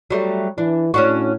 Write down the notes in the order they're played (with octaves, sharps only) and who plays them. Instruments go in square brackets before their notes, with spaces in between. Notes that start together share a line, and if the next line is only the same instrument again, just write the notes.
[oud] F#3 G3 A3
[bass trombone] E3 [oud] D4
[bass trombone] A2 [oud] C#4 D4 F#4